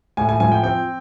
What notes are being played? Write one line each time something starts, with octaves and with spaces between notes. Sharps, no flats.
A2 G#5
G#5
F3 G#5
G5
C4 G5